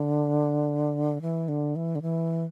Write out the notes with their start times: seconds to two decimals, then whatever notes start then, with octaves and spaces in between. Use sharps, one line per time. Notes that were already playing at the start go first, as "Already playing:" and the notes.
Already playing: D3
1.22 E3
1.48 D3
1.76 E3
1.95 D3
2.02 E3